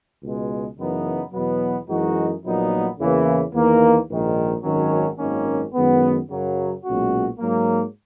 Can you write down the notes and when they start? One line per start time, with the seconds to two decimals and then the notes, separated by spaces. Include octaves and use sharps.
0.23 C#2 B2 G#3
0.78 F#2 C#3 E3 B3 D#4
1.33 E2 B2 F#3 B3
1.88 F#2 E3 G#3 D#4 F#4
2.43 A#1 A#2 F#3 B3 D#4
2.99 E2 C#3 E3 A#3
3.54 E2 D#3 A#3
4.09 A#1 G#2 D#3
4.64 G#1 F#2 D#3 F#3 C#4
5.19 G#1 F#2 D#3 A#3 C#4
5.74 F#2 D#3 G#3 B3
6.29 F#2 C#3 F#3
6.84 B1 A#2 G#3 C#4 F#4
7.40 G#2 F#3 A#3